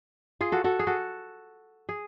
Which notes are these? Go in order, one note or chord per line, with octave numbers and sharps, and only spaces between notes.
F4 G#4
F#4 A4
F#4 A4
G#4
F#4 A4
G#4